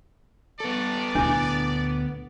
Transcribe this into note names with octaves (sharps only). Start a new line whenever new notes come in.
B3 A4 D5
D2 A#2 D4 E4 D6